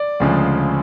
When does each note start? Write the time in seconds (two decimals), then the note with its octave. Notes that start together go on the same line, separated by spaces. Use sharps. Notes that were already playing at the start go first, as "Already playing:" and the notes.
Already playing: D5
0.20 D2 C#3 F3 G#3